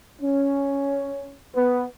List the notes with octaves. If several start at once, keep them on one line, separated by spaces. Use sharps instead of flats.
C#4
B3